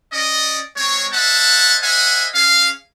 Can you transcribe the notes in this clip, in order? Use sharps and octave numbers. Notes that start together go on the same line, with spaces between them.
C#4 D5 D#5
G#3 C4 C#5
C5 D#5 E5 F#5 A5
C5 D#5 E5 F#5 G#5
C#4 G#4 F5